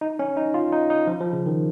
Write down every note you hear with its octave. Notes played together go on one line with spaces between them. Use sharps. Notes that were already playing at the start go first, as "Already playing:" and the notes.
D#4
C#4
D#4
F4
D#4
D#4
F3
F3
C#3
D#3